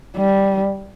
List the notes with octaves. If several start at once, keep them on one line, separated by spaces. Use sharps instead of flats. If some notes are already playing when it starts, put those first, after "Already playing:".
G3